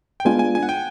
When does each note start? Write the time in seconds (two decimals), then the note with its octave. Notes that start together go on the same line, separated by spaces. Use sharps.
0.20 G5
0.25 G#3 B3 D4 F4 G#5
0.39 G#5
0.55 G#5
0.63 F#5
0.69 G5